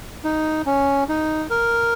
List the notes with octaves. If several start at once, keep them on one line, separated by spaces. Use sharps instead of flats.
D#4
C#4
D#4
A#4